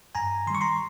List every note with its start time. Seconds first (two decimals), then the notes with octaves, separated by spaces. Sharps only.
0.15 G2 G#5 A#5
0.47 D#3 C6
0.50 G3 C#6
0.61 A#5 C6